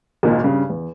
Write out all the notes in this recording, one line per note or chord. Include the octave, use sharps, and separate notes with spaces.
G#1 C#2 A#2 D#3
G2 C#3
E2